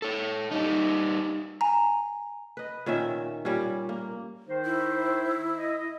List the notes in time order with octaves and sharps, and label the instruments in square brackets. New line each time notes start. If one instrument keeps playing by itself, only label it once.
[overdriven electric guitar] A4 C#5
G3 D#4
[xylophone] G#5 A#5
[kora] B4 D#5
A#2 D#3 C#4 E5
A#2 G3 C#4
A#3
[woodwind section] D#3 D#4 C5
[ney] E4
[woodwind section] D#5